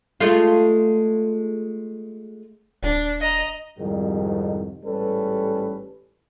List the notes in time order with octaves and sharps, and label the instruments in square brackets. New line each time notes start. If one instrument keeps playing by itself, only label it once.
[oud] G#3 A3 F4
[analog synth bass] D#1 [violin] D4
[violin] D#5 A#5
[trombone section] C2 F2 G#2 D#3 G3
A1 G#2 G3 C#4 A4 B4